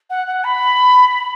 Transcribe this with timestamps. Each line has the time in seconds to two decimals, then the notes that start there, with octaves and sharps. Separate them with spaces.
0.10 F#5
0.27 F#5
0.44 B5